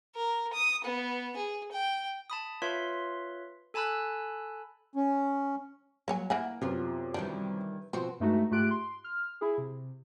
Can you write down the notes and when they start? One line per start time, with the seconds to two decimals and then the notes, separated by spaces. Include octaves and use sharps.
0.16 A#4
0.53 D#6
0.84 B3
1.36 G#4
1.72 G5
2.30 A5 B5 D#6
2.62 F4 B4 C#5 E5 F5 C6
3.74 A4 G#5 A5 B5 E6 F#6
4.95 C#4
6.08 F#3 A#3 C#5 G#5
6.30 E3 A#3 F#5 G#5
6.61 F#2 C3 B3 F4
7.14 D#3 E3 G3 D4
7.93 B2 F3 C4 F#4 C5
8.20 G2 G#3 A3 D#4 F#4
8.51 G#2 A3 F4 G4 F#6 D7
8.71 C6
9.04 F6
9.41 E4 G#4
9.58 C3